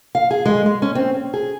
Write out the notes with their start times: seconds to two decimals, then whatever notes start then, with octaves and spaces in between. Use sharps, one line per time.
0.15 F5
0.31 G#4
0.46 G#3
0.66 G#3
0.82 C#4
0.95 C4
1.14 C#4
1.34 G#4